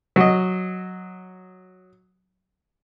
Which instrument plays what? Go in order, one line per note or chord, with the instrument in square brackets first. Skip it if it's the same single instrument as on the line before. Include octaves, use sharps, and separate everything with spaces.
[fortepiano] F#3 D#5